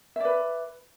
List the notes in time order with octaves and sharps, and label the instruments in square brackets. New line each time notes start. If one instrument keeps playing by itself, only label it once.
[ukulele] E5
D5
B4